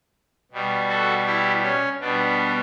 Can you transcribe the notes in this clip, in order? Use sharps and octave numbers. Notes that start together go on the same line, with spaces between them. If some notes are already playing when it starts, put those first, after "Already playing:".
B2 G3
F#4 A4
E4 G4
C#4
B2 G3 B3 D4